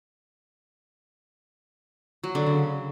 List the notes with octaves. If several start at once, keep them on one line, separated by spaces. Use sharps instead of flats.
F#3
D3
C#3